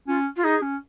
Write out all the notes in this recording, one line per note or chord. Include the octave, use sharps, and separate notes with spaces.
C#4 F4
F4
D#4 G#4
C#4